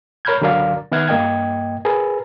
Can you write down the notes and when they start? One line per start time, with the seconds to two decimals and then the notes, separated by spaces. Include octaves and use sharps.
0.25 A#4 C#5 B5 F6 G6 G#6
0.41 C#2 D3 F#3 A#4 D5 F5
0.92 D#3 B3 E5 F6 F#6 G#6
1.08 G2 A#3 D#5 G5 G#6
1.85 G#4 A#4 B4